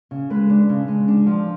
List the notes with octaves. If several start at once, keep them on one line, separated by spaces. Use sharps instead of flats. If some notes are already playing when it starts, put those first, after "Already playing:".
C#3
G#3 B4
D4
C#3
G#3
D4
F3